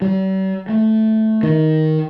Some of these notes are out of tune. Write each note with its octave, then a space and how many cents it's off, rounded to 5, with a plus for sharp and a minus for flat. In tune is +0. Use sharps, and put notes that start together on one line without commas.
G3 -45
A3 -5
D#3 +10